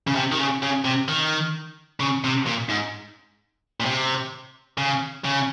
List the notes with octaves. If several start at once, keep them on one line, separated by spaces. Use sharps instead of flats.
C#3
C3
D#3
C#3
C#3
C3
D#3
C#3
C3
A#2
G#2
A#2
C3
C#3
C#3